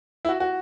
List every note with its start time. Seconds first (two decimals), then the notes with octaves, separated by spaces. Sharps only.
0.25 E4
0.29 F#4
0.40 F#4